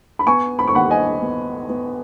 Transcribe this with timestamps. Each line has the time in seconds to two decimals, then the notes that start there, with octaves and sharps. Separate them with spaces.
0.19 B5
0.27 B3 G#5 C#6
0.59 B5
0.67 C#6
0.74 D#2 F#5 B5
0.90 D#5 G#5
1.22 B3
1.69 B3